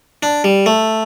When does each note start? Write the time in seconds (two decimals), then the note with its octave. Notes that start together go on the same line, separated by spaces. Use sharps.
0.23 D4
0.44 G3
0.66 A3